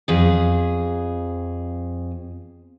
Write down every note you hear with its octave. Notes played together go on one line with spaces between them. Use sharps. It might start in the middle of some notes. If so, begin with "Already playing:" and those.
F2 G#4